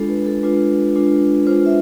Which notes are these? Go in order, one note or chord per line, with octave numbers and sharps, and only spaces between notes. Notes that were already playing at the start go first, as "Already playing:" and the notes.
Already playing: G#3 D4 F4 A4
B4
A4
G#3 D4 F4 B4
G#3 D4 F4
G#3 D4 F4 C5
E5